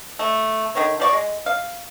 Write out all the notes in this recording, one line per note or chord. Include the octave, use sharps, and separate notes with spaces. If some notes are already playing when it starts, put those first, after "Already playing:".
A3
D3 D#3 C#5
F3 D5 C#6
G#3
F5